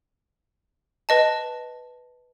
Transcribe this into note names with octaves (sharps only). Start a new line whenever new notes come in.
B4 D#5 A5